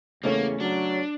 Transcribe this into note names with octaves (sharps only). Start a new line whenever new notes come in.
E2 C#3 A3 A#3 C#4
F#3 D4